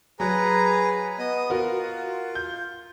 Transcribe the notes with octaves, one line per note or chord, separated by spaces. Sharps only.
F#3 G#4 B4 A#5
B3 D#5 D#6
F4 F#4 A#4
G6